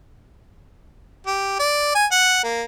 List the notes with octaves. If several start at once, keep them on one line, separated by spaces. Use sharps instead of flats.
G4
D5
G#5
F#5
A#3